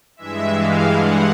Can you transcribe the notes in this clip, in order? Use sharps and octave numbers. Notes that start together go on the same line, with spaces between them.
G2 E3 G#3 E5
F5
F#5